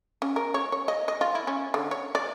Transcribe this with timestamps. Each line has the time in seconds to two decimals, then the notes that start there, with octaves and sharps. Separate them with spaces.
0.22 C#4
0.36 A#4
0.54 C#5
0.72 C#5
0.88 D#5
1.08 D#5
1.21 F4
1.35 E4
1.47 C#4
1.74 D3
1.91 C#5
2.15 D5